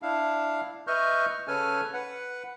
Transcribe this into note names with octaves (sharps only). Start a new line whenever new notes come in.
D4 E4 F5
B4 D#5 E5 C#6 F6 G6
C#3 C#4 A4 B4 G#5 F6
B4 F#5